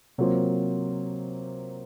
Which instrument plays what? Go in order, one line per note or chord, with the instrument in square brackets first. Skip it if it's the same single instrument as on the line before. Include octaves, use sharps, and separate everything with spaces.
[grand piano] C3 F#3 A#3 F4 C5